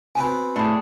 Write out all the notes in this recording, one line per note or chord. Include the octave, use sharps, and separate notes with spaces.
B3 C4 F#4 G#5
A2 D4 G#4